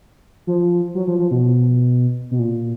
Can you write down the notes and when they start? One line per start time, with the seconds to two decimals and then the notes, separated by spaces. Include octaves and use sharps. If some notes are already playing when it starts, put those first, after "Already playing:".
0.47 F3
0.95 F#3
1.07 F3
1.19 F3
1.31 B2
2.31 B2
2.39 A#2